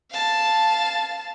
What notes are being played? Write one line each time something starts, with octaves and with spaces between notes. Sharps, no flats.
F5 A5